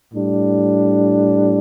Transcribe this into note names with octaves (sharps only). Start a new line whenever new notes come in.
A2 G3 D4